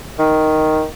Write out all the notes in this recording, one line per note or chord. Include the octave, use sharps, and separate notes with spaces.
D#3